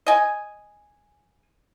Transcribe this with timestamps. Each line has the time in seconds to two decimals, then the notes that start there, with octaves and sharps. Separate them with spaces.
0.06 D#5 G#5